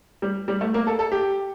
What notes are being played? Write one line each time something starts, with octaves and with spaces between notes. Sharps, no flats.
G3
G3
A3
A#3
A4
A4
G4